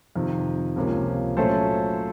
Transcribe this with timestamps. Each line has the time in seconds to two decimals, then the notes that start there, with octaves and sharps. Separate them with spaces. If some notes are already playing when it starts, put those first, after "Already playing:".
0.16 F2 C3 D#3
0.76 C#2 C3 F3 A#3 C#4
1.37 A#2 F#3 A3 C#4 A4 C5